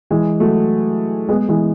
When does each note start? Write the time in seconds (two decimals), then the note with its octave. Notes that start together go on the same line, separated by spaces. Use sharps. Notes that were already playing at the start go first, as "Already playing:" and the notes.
0.11 E3 G#3
0.40 F#3 A3
1.29 G#3 B3
1.48 E3 G#3